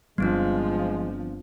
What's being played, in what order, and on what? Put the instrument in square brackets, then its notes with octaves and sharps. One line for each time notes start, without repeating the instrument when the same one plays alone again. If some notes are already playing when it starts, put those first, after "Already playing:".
[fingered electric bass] G1 G3 [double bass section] F3 [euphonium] G#3 [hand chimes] B3 C4 D4